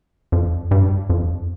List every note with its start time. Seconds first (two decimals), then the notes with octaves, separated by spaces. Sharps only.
0.32 F2
0.71 G2
1.10 F2